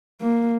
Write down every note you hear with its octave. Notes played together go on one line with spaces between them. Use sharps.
A#3